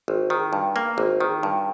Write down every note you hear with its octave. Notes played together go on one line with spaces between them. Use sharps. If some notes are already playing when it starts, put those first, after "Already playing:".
G#1
D#3
G2
A#3
G#1
D#3
G2